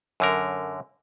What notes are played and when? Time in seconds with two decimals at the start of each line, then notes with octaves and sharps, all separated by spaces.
0.20 F#2 D3 A#4